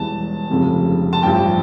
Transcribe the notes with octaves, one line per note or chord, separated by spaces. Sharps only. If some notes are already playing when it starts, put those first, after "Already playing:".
Already playing: E1 E2 E3 G3 A5
F1 F2 C#3 F3
A5
A1 G2 F3 G5